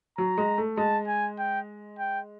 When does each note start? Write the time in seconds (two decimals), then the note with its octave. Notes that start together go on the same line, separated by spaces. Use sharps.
0.18 F#3 A#5
0.38 G#3
0.58 A3
0.77 G#3 A5
1.08 G#5
1.39 G5
1.99 G5